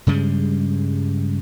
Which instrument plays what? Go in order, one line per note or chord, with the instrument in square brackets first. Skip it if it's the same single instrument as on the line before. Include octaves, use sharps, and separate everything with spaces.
[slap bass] G2 C#3 G3 G#3